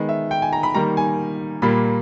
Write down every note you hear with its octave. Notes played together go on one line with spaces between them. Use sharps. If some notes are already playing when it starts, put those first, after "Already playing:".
Already playing: D#3 G#3 B3
E5
G5
G#5
A#5
B5
D#3 G3 A#3 A#5
G#5
A#2 G3 A#3 B5